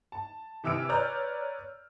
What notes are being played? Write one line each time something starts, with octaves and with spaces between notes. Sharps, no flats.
A5
C3 E3 E5 E6 F6 D7
B4 C#5 D5 A#5 F6 G6